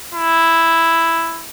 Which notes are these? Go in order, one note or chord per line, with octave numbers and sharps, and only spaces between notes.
E4